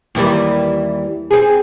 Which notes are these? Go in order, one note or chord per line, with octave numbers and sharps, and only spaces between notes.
D#2 E3 G3
C4 G#4